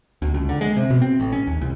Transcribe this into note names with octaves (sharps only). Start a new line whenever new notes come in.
D2
C#2
D3
G#3
C3
B2
C4
A1
C#4
D#2
C2